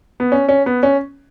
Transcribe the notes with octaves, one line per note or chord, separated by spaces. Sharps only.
B3
C#4
C#4
B3
C#4